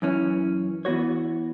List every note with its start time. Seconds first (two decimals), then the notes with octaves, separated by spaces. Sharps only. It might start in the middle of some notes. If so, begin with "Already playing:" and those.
0.02 F#2 E3 C#4
0.85 E3 B3 F#4 C#5